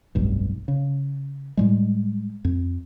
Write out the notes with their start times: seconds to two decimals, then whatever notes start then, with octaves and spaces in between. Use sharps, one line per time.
0.15 F1 B1 G2
0.68 C#3
1.57 A2 G3 G#3
2.45 F2